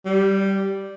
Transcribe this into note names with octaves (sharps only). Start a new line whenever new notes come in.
G3